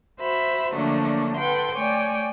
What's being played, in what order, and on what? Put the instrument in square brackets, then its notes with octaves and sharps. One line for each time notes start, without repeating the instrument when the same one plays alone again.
[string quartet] F#4 C5 E5 B5
D3 F3 F#3 A3 A#3 D4
A4 B4 F#5 G5 C6
A3 C#5 D5 G5 G#5